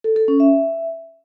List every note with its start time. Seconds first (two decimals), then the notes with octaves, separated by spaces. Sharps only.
0.04 A4
0.16 A4
0.28 C#4
0.40 E5